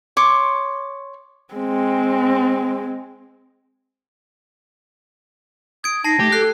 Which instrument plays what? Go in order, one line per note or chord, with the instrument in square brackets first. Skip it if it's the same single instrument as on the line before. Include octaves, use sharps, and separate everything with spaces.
[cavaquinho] C#5 C6 D6
[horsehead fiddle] G#3 C4
[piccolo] D#6 [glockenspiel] G#6 D7
[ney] D#4 [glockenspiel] A5 C7 [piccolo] A#6
[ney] A3 [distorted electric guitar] G4
[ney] A4 [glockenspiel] F#6 C7